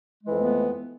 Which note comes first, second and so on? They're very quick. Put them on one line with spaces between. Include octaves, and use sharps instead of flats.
G#3 E3 F2 A3 B3